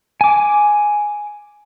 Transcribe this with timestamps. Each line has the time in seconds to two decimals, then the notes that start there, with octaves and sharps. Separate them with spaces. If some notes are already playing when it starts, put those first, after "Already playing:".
0.21 G#5 D6